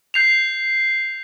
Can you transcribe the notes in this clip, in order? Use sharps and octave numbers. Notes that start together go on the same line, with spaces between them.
G6 C7 F7